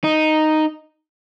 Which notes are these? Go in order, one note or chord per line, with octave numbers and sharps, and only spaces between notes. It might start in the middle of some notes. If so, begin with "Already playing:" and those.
D#4